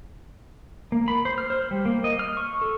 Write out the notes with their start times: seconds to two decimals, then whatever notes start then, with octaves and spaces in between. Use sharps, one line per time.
0.92 A#3
1.08 B5
1.25 C5
1.38 F6
1.50 C5
1.71 G3
1.85 A#3
2.04 D#5
2.19 F6
2.37 C#6
2.61 A4